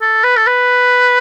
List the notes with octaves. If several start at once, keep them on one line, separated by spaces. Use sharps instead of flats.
A4
B4
A4
B4